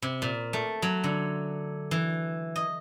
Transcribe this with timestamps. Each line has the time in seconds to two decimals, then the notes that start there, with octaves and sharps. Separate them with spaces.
0.02 C3
0.22 A#2
0.53 A3
0.82 F#3
1.04 D3
1.91 E3
2.56 D#5